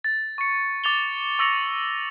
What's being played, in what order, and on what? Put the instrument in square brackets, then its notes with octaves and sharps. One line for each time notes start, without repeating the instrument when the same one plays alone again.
[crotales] A6
C#6 C#7
D6 A6 F7 G7
C#6 E6 A#6 C#7 F7